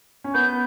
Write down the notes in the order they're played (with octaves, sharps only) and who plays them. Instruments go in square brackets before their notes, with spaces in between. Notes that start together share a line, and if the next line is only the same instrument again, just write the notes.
[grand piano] C#4
[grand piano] B3 [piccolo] G6